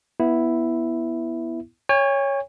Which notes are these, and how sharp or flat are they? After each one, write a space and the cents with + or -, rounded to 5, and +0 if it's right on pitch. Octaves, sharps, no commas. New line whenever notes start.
B3 -15 E4 +0
C#5 +0 G#5 -45